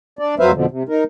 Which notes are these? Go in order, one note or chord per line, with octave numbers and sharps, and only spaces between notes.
D4 D5
F2 F#3 B4 C5 E5 F5
F2 B2 D3 F3
C3
D#4 A#4